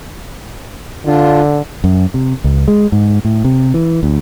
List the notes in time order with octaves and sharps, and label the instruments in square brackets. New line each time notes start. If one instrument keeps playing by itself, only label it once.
[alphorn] D3 [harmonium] D4 F4
[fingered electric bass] F#2
C3
C#2
G#3
G#2
A2
C3
E3
D2